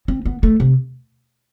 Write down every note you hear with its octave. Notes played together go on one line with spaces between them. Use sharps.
C4
B3
A3
C3